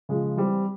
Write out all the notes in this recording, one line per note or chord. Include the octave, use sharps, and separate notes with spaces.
C#3 F3 G#3
E3 G3 C4